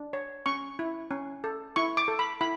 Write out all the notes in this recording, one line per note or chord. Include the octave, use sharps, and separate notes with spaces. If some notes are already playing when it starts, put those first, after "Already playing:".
Already playing: D4
C#5
C#4 C#6
E4
C#4
A4
E4 C#6
D6
A4
B5
E4 B5